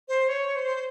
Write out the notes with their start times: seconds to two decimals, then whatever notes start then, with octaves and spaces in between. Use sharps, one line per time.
0.08 C5
0.29 C#5
0.56 C5